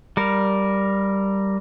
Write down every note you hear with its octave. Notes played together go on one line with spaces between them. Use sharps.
G3 A#4